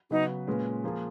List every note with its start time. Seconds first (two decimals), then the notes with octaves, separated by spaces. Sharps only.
0.11 C#3 F#3 B3 D#4 F#4 B4
0.47 A#2 G#3 C#4 F4 B4
0.84 F3 A#3 F4 G#4